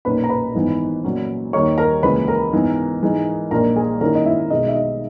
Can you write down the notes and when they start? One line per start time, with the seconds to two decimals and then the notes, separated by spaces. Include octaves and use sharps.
0.05 B1 A#2 A#3 C#4 B4 B5
0.24 A#5
0.30 B4 B5
0.54 G#1 G#2 E3 B3
1.04 A#2 F#3 C#4
1.53 D#2 D#3 A#3 D#4 C#5 C#6
1.78 A#4 A#5
2.03 C#2 C#3 E3 A#3 B4 B5
2.28 A#4 A#5
2.53 G#2 E3 B3
3.02 G#2 E3 G#3 D#4
3.51 A#1 A#2 A#3 D#4 A#4 A#5
3.76 G#4 G#5
4.01 G#2 D#3 A#3 C#4 E4 A#4 A#5
4.15 D#5
4.25 E4 E5
4.50 B1 B2 G#3 D#4 D#5
4.68 E5
4.75 D#4 D#5